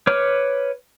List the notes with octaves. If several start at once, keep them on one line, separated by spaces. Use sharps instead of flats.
B4 C#5 D6 F6